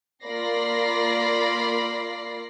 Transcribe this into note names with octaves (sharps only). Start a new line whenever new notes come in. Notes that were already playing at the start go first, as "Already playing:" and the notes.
A#3 F4 D5 B5 A#6 C7